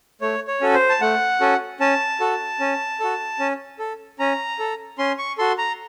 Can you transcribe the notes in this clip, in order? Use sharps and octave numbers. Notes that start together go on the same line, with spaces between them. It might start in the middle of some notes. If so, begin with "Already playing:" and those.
A3 C#5
C#5
C#4 F#4 A4
C5
A5
A3 F#5
C#4 F#4 A4
C#4 A5
F#4 A4
C#4
F#4 A4
C#4
A4
C#4 A#5
A4
C#4 C6
C#6
F#4 A4 C6
A#5